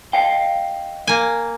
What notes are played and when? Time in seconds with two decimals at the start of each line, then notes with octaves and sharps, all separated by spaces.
0.13 D#5 F5 G5
1.07 A#3 G#5